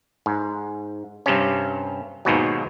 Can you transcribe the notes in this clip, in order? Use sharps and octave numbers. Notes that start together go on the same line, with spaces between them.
G#2
G2 C3 C#4
D#2 G#2 B2 F#3